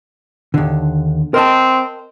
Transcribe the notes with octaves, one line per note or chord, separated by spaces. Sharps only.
D#2 D3
C4 A#4 D#5 A5